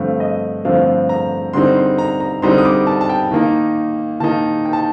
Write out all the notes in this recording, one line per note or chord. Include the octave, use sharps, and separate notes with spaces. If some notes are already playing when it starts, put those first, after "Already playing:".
Already playing: G2 D3 F3 A3 C4 F5
D#5
G2 D3 F3 A3 C4 F5
A#5
D3 G3 C4 D#4 C6
C6
A#5
A#5
D3 G3 C4 D#4 C6
D#6
D6
A5
A5
G5
D#3 A#3 D#4
D#3 A#3 D#4 A5
G5
A5